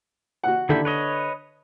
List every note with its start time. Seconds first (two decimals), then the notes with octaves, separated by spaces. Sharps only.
0.43 F#4 F#5
0.69 D3 D#3 E4 G4
0.85 B4 C#5 D#5